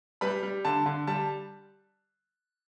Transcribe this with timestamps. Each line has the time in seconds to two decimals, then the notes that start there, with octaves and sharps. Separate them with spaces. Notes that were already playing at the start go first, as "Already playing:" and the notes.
0.21 G3 B4 B5
0.43 G3
0.65 D3 A5
0.86 D3
1.07 G3 A5